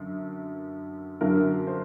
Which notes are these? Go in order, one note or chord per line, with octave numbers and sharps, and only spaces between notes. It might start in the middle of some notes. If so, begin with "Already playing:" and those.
Already playing: F#2 D3 F#3
F#2 D3 F#3 A#4
C5